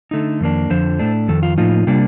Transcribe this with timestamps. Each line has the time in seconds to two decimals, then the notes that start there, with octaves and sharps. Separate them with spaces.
0.11 D3 A3 D#4
0.41 F2 D#3 A#3 D4
0.70 F2 D3 F3 C5
0.99 A2 A3 D4
1.28 F2 D#3 A4
1.43 F4
1.58 A2 F3 A#3 D#4 F4
1.87 C3 G3 A#3 D4